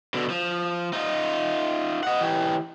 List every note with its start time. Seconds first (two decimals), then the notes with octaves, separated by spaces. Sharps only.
0.14 B2 D3
0.30 F3
0.93 D#4 F4
2.03 D#5 F#5
2.21 E3 G4